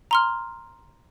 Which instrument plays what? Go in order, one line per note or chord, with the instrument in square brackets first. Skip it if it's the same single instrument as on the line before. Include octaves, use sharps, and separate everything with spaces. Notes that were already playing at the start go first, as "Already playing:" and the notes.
[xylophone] A#5 C6 F6